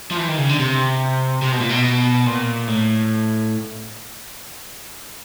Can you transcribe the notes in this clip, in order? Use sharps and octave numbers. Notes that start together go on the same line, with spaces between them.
F3
E3
D#3
C#3
D3
C3
C3
B2
A#2
B2
A#2
A2